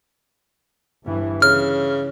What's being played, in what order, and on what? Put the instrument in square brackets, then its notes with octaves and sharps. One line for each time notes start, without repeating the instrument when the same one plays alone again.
[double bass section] G1 G2 E3
[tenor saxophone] C#3 [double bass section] E3 [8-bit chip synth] F6